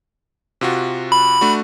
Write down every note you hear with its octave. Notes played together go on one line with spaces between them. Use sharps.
C3 F4 F#4
B5
A3 D4 F#4